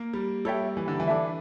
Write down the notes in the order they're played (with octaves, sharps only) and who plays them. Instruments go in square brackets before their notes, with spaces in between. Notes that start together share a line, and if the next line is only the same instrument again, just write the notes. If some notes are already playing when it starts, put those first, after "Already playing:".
Already playing: [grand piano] A#3
G3
[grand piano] G3 [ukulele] A4 C#5 E5 G5
[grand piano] E3
D3
E3
[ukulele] D4 A4 E5